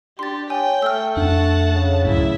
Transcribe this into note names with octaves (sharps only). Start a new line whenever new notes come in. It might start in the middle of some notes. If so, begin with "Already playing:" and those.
D4 G4 C6 A6
C#5 G5 G#5
A3 E6 F6
F2 D4 F#5 A5
C#3
C#2 F#2 A2 E4 E5